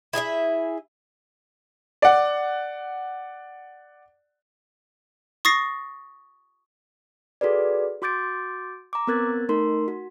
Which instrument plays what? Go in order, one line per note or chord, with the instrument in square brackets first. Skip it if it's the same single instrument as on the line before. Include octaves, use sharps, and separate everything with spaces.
[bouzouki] E4 G#4 D#5 E5
[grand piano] D5 F#5
[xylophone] C#6 D#6 A6 A#6 C7
[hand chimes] F#4 G#4 A4 B4 D5
F#4 C6 D6 G6 A6 D7
A#5 D6
B3 C4 A#4 F#6 G#6 A6
A3 D#4 A#4 C6
F#4